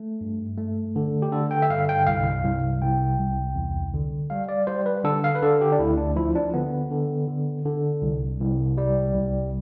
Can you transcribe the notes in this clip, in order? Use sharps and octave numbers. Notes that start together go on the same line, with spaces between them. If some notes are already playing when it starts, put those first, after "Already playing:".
Already playing: A3
G2
A3
D3
G4
D3 A4
G5
E5
G2 F5
G5
C2 F5
C2
C2 G5
C2
E2
D3
G3 F5
D5
G3 C5
B4
D3 A4
F5
B4
D3 A4
G4
D4
D2 E4
D4
F3 E4
D4
D3 B3
D3
D3
D3
C2
C2
G3
C2